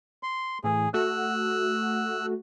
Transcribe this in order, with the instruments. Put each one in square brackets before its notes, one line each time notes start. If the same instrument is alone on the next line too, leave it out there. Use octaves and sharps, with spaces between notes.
[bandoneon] C6
[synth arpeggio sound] A2 E3 [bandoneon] G#4
[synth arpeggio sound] A3 F#4 [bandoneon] E6 F#6